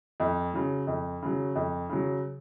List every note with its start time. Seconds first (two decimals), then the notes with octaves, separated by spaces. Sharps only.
0.20 F2
0.54 C#3 F#3
0.87 F2
1.22 C#3 F#3
1.55 F2
1.89 C#3 F#3